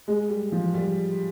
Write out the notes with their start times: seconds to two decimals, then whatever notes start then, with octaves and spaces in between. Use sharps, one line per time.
0.08 G#3
0.29 G3
0.52 F3
0.74 G3